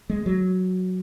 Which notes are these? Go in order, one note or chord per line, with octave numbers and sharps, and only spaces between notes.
G#3
F#3